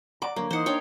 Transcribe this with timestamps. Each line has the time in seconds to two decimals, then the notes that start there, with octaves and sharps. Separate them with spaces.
0.22 D5 F#5 A#5 D6
0.36 D3 F#3 A#3 C#5
0.51 E3 D#4 C5 F#5
0.66 D4 C#5 F5 G5